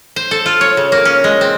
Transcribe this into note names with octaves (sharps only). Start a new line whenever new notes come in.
C5
A4
F4
C#5
C#3
A#3
C#4
G#3
C4